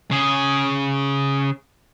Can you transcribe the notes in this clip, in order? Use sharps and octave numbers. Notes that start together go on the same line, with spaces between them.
C#3 G#4